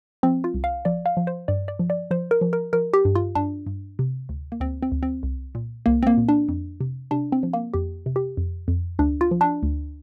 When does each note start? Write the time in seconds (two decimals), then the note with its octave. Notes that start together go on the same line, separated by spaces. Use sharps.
0.23 F3 C4
0.44 F4
0.54 C2
0.64 F5
0.85 F3 D5
1.06 F5
1.17 F3
1.27 C5
1.48 G2 D5
1.68 D5
1.79 F3
1.90 D5
2.11 F3 C5
2.31 A#4
2.41 F3
2.53 A#4
2.73 F3 A#4
2.93 G4
3.05 G2
3.15 F4
3.35 G2 D4
3.66 G2
3.99 C3
4.29 D2
4.52 A#3
4.60 D2 C4
4.82 C4
4.92 D2
5.03 C4
5.23 C2
5.55 A#2
5.86 C2 A#3
6.03 C4
6.07 A#3
6.17 A#2
6.29 D4
6.49 F2
6.81 C3
7.11 C3 D4
7.32 C4
7.43 F3
7.53 A#3
7.74 F2 G4
8.06 C3
8.16 G4
8.37 F2
8.68 F2
8.99 D2 D4
9.21 F4
9.31 F3
9.41 D4
9.63 D2